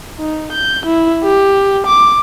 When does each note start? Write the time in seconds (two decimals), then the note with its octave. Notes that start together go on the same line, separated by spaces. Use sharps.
0.19 D#4
0.53 G6
0.86 E4
1.24 G4
1.87 D6